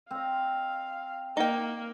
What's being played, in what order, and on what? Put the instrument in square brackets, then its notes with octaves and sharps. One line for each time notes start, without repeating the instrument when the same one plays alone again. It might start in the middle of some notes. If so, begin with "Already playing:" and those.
[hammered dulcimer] C4 D#5 [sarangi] F5
[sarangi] A#3 [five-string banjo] D#4 G5